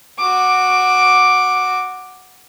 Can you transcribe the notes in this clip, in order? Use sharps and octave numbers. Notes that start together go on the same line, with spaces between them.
F#4 D6